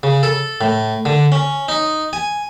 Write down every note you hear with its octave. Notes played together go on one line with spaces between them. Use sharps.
C#3
A4
A2
D3
C#4
D#4
G#5